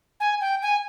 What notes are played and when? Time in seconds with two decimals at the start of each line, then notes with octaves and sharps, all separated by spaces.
0.20 G#5
0.41 G5
0.62 G#5